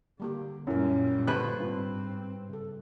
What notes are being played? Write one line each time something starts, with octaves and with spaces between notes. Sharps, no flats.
D3 G3 A#3 G4
F#2 A#2 G3 E4 A#4
G2 D3 B3 B4 C5 F#6
G#2 C4 D4 F4
C#3 A4